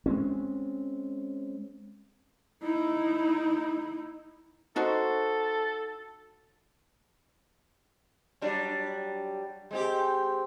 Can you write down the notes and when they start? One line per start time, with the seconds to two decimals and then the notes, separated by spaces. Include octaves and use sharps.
0.06 G#3 C4 C#4
2.62 D#4 E4
4.76 D#4 F#4 A4 C5
8.41 F#3 G3 D4
9.71 G#3 C4 G4